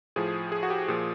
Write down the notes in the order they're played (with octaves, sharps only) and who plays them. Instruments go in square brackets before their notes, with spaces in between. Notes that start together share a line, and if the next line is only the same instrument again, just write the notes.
[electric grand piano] A2 F3 G#4
G#4
F#4
G4
A#2 F3 G#4